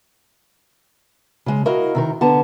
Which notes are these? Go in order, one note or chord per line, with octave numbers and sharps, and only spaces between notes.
C#3 G#3
E4 F#4 A#4 D#5 F5
C3 D#3 A#4
D3 B3 A5 A#5